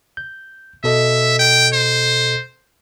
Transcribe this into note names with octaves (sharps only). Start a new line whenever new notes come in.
G6
B2 A4 D#5 E5
G5
C5